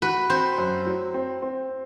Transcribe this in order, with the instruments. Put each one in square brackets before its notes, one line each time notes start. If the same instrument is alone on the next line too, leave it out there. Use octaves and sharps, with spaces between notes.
[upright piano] F#4 [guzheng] B4
[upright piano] C4 [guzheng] C5
[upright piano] F#2
F#3
C4
C4